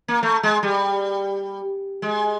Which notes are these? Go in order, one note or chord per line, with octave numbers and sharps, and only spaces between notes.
A#3
A3
G#3
G3
G#3